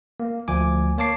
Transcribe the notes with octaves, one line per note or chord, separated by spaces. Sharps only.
A#3
D2 F3 G#5 D6
A#3 C#5 A5 D6 C7